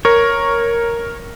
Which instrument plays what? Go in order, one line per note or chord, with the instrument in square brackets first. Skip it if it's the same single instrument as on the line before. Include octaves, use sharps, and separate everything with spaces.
[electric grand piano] A#4 [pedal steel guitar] C#5